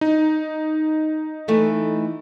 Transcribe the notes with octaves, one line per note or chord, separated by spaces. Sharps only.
D#4
E3 A3